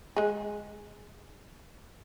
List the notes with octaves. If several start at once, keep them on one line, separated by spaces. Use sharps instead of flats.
G#3 G#4